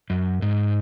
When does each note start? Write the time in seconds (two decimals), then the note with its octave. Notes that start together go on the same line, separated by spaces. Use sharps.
0.10 F#2
0.42 G#2